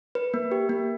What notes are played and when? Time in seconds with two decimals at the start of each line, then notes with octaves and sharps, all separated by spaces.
0.15 B4
0.34 A#3
0.51 G4
0.69 A#3